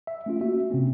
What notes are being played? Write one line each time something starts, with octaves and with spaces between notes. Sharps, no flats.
E5
A3 C#4 F4
A#3 F#4 E5
C3 C4 C#4